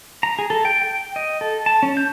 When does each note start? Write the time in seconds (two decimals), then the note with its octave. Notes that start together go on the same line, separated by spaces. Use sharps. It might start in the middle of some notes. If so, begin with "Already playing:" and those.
0.23 A#5
0.39 G#4
0.50 A4
0.65 G5
0.82 G5
1.16 D#5
1.41 A4
1.66 A5
1.83 C#4
1.97 G6